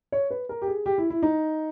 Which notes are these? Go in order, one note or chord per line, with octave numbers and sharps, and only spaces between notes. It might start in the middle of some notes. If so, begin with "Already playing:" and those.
C#5
B4
A#4
G4
G#4
G4
E4
E4
D#4